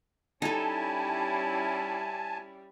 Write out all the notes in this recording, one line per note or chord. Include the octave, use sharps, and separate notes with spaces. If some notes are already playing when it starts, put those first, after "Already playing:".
G3 C#4 D#4 E4 A4 G#5 A5